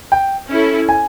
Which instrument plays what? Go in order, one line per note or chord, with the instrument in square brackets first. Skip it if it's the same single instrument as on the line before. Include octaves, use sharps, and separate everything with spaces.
[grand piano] G5
[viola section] C#4 E4 A4
[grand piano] G#5